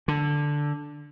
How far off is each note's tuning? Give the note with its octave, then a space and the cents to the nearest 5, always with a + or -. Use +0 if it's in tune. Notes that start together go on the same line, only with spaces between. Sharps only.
D3 +0